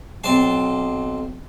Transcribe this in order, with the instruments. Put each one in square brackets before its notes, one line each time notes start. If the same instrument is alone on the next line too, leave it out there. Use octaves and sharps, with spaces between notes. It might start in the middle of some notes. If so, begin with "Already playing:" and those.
[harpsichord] B1 C4 A5 C6